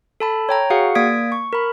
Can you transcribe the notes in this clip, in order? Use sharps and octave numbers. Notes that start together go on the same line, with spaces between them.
A4 A5 B5
C#5 G5 A#5
F#4 G#4 F5 F#5
A#3 D5 D#6 G#6 B6 D7
C#6
A#4 B5